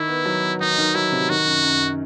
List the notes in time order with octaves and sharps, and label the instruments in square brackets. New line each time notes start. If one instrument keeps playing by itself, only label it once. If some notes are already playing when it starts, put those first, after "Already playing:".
Already playing: [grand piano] D#3 [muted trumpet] E4
[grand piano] B3
F#3
B3
[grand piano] D#3 [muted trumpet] D#4
[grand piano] D#3
[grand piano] F#3 [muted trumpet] E4
[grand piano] C3
[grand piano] D#3 [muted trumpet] F#4
[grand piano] F#2
F#2